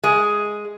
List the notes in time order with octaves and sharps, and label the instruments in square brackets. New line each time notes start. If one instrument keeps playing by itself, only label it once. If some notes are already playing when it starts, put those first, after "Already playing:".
[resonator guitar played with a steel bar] G#3